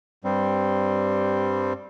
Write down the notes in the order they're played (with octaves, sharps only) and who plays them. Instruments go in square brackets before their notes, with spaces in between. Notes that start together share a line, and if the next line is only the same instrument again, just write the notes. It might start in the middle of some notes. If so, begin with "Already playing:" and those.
[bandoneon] G2 G3 C4